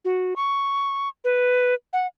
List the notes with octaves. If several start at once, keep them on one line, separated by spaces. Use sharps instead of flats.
F#4
C#6
B4
F#5